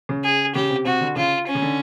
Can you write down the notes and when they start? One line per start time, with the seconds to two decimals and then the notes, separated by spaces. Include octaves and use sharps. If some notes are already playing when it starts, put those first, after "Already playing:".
0.09 C#3
0.24 G#4
0.55 C#3 G4
0.70 C3
0.85 C3 F#4
1.01 D3
1.16 C#3 F4
1.47 C#4
1.55 C#3
1.62 D3